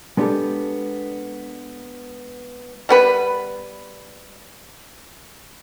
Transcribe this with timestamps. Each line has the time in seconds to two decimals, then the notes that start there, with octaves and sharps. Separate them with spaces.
0.17 G#3 B3 D4 F4 G4 A4
2.89 G3 B3 B4